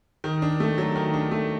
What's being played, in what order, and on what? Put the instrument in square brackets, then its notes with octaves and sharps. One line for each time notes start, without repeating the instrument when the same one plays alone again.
[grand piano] D#3
D4
A3
F#3
D#3
D4
A3